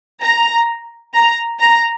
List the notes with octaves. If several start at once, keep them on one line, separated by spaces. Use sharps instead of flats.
A#5
A#5
A#5